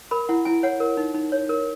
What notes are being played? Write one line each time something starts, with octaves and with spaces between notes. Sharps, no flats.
A#4 B5
E4 F#5
E4 G#5
C#5 F#5
A#4
D#4
D#4
C#5
A#4